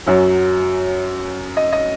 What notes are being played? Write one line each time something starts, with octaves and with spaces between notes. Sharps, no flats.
F#2 F#3 C#4
D#5
D#5